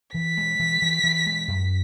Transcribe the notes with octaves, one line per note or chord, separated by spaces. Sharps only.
E3 B6
G#3
E3
E3
E3
G#3
F#2